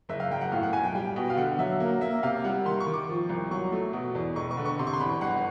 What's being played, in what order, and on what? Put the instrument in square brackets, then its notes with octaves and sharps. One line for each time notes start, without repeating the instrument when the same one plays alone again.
[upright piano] F#1 E5
F5
F#2 G5
F#5
A2 F5
F#5
B1 G#5
G5
G3 G5
B2
F5
D3 F#5
F#3 E5
A#3
A#3 E5
C3 F5
G3 F#5
D#3 C6
C#6
D#3
D6
F3
C2
F#3 C#6
A3
B2
E2
E1 C#6
C#6
D3
C#6
C3 C6
C#6
C6
E2 B5
G1 F#5